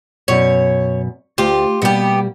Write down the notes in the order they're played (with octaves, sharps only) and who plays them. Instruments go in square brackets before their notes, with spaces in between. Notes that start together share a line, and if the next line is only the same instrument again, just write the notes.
[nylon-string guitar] F#2 B2 [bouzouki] C#5
[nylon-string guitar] D2 [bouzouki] F4 G4
[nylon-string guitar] B2 G3 A#3 [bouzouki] B3 G4